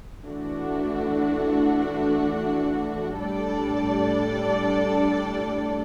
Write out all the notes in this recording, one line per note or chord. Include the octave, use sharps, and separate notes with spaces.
E3 A3 D4 F#4
A2 G3 D4 A4 D5